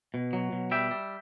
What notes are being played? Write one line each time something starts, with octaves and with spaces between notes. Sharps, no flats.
B2
F#3
B2
G3 E5 G5
G3